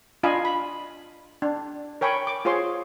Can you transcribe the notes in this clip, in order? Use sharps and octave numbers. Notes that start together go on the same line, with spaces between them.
D4 F4 D#5 F5 G#5 B5
B5
D4
A#4 C#5 G5 G#5 B5 C#6
D6
F4 G#4 C5 C#5 C6